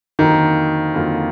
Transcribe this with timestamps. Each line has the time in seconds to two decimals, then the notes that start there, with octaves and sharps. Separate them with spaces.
0.19 F2 D3 D#3 F#3 A#3 F4
0.94 F2 D3 F#3 A#3 F4